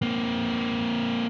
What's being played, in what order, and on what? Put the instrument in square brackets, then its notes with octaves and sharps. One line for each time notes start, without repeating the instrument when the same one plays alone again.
[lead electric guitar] A#3 C4